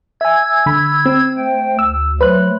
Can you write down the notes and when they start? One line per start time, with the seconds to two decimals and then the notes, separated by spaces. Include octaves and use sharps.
0.21 E5 G#5 E6 G#6
0.66 D3 B5
1.05 C4
1.37 A3 C5 G5
1.79 D2 E6
2.21 F#3 A3 B4 C5 F#6